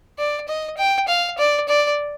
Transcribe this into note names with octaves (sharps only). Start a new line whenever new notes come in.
D5
D#5
G5
F5
D5
D5